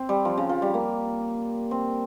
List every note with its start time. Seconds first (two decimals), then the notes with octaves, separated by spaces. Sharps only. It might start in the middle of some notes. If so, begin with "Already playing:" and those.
Already playing: C4
0.09 G3
0.25 F3
0.37 C#3
0.49 F3
0.62 G3
0.74 A#3
1.71 C4